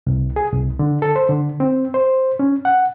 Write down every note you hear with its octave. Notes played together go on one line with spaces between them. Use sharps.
C2
G#4
C2
D3
A4
C5
D3
C4
C5
C#4
F#5